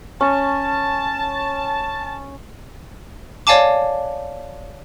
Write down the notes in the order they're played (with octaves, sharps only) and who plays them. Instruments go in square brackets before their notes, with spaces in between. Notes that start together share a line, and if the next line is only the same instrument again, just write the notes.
[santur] C#4 [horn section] A5
[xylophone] C#5 D5 F5 G#5 A5 D6